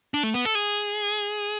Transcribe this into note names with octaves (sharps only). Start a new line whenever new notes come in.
D4
A3
B3
A4
G#4